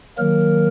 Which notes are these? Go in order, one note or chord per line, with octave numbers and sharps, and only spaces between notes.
D#3 F#3 A#3 A#4